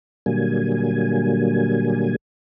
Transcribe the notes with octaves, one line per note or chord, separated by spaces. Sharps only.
A#2 D3 F#3 G3 A#3 G#5